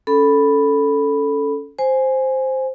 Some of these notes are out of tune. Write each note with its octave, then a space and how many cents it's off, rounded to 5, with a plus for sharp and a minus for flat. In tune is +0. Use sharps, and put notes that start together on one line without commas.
C#4 +15 A4 +0 B5 +0
C5 +0 G#5 +0